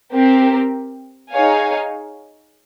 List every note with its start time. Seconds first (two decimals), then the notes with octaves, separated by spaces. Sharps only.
0.13 C4 G4 A#4
1.33 D#4 G#4 C#5 F5 G#5